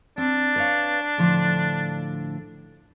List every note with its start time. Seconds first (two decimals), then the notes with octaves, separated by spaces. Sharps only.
0.18 C4 D4
0.56 B4 C#5 F5
1.18 A2 D3 F3